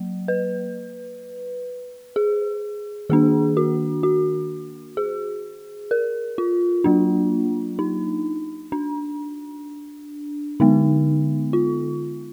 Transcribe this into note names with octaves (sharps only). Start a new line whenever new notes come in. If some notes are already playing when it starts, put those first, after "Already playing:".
Already playing: F#3 A#3
B4
G#4
D#3 A#3 D4 G#4
F#4
F#4
G#4
A#4
F4
F#3 A#3 D4
D#4
D4
D3 G#3 B3 D#4
F4